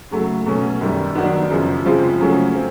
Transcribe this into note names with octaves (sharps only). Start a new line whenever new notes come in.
C#3 F#3 A3
B2 F#3 A3 C#4
F#2 D#3 G3
D#3 F#3 B3 D4
F#2 C#3 F3
C#3 F3 G#3 C4 F4
C#3 F#3 A3 C#4
C4 F4